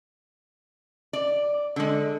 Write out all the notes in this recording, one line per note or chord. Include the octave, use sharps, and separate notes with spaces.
D5
D3 G#3